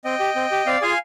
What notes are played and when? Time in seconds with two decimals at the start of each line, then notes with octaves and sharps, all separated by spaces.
0.05 C4 D#5 G5
0.20 G4
0.36 C4
0.52 G4
0.66 C4 D5 F5
0.82 F4 G#4 F5 G#5